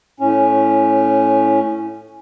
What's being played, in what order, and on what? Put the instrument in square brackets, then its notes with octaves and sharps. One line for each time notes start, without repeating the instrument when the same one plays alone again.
[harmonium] A2 C#4